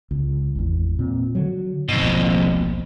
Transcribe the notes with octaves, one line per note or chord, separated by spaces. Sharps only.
C#2
G#1 E2
A#2 C4
D3 F#3
F2 G#2 B2
D1 A#1 A#2